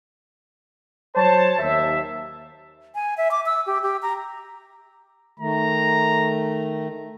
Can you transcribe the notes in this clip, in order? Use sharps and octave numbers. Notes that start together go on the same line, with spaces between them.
F#3 C5 C#5 A5
D#2 E5
G#5
E5
D6
E6
G4
G4
A#5
D#3 A3 A#5